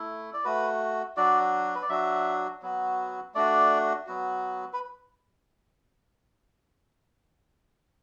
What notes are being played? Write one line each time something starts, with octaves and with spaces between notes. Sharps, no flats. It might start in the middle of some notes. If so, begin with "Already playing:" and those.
Already playing: A3 E4
D5
A3 F#4 B4
F#3 D4 F#4 D5
B4
D5
F#3 D4 F#4 E5
F#3 B3 F#4
A3 D4 F#4 D5
F#3 B3 F#4
B4